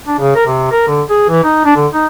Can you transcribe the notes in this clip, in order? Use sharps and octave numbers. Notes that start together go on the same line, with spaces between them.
D4
C#3
A#4
C3
A#4
D3
G#4
E3
D#4
D4
D3
D#4